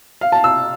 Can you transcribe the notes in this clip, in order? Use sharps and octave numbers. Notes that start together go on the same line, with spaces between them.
F5
A5
E6